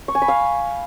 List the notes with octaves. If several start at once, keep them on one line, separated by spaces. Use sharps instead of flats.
C#6
G#5
B5
F5